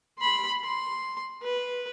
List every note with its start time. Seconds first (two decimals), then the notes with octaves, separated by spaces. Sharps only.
0.19 B5 C6
0.64 C6
1.42 B4